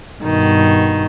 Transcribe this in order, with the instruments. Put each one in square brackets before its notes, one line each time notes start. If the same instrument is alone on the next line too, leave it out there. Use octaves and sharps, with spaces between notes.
[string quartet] G2 B2 D#3